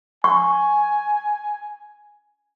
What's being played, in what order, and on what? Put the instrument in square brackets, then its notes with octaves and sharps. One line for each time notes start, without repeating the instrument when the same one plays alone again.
[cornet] G#5 [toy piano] C#6